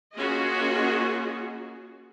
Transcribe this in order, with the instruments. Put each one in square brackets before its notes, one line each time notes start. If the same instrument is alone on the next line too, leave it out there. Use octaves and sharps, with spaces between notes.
[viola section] A#3 C#4 F4 F#4 G#4 D#5